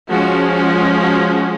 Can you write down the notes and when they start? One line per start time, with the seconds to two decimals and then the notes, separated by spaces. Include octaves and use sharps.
0.10 F3 G#3 C#4 F#4
0.53 F#4
0.97 F#4